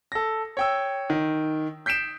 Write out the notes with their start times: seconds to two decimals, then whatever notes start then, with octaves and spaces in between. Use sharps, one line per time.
0.12 A4 A#6
0.57 C#5 G5 E6
1.10 D#3
1.86 G6 B6 C7 D7 E7